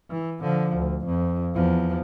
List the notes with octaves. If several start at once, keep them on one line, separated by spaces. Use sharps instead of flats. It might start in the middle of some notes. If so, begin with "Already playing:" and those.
E3
D3 F3
D2
F2
E2 F3